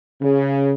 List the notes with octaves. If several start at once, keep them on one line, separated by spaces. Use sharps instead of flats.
C#3